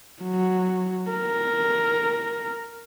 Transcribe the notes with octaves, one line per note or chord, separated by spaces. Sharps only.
F#3
A#4